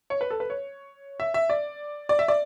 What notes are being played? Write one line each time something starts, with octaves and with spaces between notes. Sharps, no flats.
C#5
B4
A4
B4
C#5
E5
E5
D5
D5
E5
D5